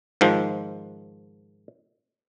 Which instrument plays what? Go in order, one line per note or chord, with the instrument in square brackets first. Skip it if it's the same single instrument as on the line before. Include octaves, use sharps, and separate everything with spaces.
[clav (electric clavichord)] G#2 D#3 F3